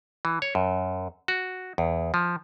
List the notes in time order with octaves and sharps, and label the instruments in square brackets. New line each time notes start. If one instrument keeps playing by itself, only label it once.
[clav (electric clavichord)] E3
C#5
F#2
F#4
E2
F3